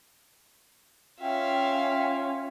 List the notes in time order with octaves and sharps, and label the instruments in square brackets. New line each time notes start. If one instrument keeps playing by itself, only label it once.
[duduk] C#4 [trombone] F4 [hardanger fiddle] E5 F5 [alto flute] G5